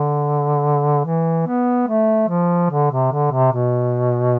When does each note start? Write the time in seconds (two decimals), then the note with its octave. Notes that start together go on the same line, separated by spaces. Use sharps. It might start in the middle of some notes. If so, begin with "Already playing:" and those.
Already playing: D3
1.05 E3
1.47 B3
1.88 A3
2.28 F3
2.70 D3
2.91 C3
3.12 D3
3.32 C3
3.53 B2